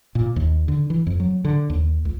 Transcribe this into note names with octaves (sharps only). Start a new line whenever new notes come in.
A#2
D#2
D3
E3
F2
F#3
D3
D#2
C#2